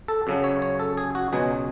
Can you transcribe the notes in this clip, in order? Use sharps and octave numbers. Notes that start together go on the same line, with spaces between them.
A4
F#2 C#3 F#3
C#5
C#5
A4
G#4
F#4
C#2 B2 F#3 G#4